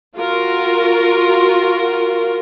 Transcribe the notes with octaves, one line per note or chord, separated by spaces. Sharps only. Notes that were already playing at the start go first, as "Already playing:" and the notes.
F4 F#4 A#4